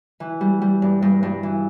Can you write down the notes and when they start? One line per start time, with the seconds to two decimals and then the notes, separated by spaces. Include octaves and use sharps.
0.20 E3
0.41 G3
0.62 G3
0.82 G2
1.02 G2
1.23 G2
1.43 E3